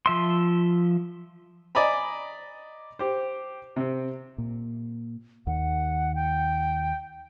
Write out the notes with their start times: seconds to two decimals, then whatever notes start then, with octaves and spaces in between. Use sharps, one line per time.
0.06 F3 E5 C6
1.75 D5 D#5 G#5 A#5 B5
2.99 G4 C5
3.76 C3 C4
4.38 A#2
5.47 D#2 D#3 F#5
6.15 G5